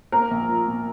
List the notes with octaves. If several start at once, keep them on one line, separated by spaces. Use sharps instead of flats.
A#3 A#4
A#1
F3
A#2